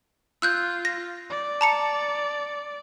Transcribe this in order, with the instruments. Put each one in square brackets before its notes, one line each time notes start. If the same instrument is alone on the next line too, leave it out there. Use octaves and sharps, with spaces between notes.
[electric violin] F4 [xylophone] E6 F#6 G6
[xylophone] A#6
[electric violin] D5
[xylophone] A5 A#5 C#7